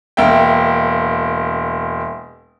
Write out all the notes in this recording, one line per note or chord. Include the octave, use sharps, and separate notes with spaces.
E1 A#3 E5 G5